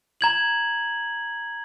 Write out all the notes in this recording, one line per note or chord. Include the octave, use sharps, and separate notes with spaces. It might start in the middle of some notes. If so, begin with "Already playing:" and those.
A#5 G#6 F#7